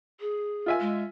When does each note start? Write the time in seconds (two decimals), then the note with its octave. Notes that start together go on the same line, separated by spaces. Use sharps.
0.20 G#4
0.66 F4 E5 G#5
0.80 G#3